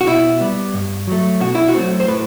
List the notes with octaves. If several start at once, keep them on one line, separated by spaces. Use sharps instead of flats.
F#4
B2 E4
G3 B3
G2
F#3 A3
B2 F#4
E4
F#4
F#3 A3 C4
C5
A2 B4